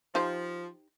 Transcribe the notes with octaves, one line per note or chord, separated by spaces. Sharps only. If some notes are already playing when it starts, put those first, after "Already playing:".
F3 D#4 G4 C5